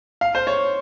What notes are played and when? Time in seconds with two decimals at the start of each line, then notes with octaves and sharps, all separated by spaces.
0.21 F5
0.35 C5
0.47 C#5